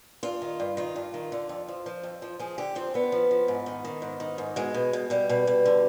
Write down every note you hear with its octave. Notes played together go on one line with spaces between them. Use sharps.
G2 F4
D#3
G2
D#3 F4
G2
D#3
D3
F2
F3
F3
F2
F3
F3 G#4
D3 G4
F3 C4
D3 B3
F3
F3
G#2
D#3
D#3
G#2
D#3
G#2
B2 G#3
B2
B2
B2 G3
B2
B2
D3